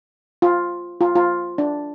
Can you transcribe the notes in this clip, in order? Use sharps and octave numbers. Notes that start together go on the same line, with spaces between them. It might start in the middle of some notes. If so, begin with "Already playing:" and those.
F4
F4
F4
D4